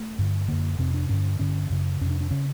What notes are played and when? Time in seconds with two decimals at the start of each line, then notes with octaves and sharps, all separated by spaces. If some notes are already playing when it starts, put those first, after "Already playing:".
Already playing: A3
0.18 G2 D3
0.48 F#2 D3 A#3
0.79 F2 C3 C4
0.94 D4
1.09 G2 D3 C#4
1.39 G2 D3 C#4
1.70 F#2 C#3
2.01 F2 C3 C#4
2.10 D4
2.21 D4
2.31 C#3 C#4